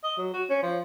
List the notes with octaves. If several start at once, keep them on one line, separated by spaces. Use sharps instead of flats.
D#5
F#3
F#4
C#4
F3